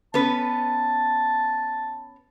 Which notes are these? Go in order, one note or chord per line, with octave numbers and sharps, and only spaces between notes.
B3 C#4 B4 A5